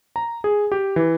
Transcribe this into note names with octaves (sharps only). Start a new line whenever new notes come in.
A#5
G#4
G4
E3